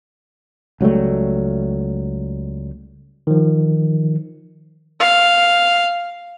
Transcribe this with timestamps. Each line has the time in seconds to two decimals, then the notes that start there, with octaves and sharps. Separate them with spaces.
0.81 C#2 F#3 G3 A3
3.27 D#3 F3
5.00 F5